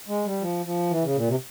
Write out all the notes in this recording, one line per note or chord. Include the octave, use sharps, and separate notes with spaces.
G#3
G3
F3
F3
E3
C#3
A#2
C3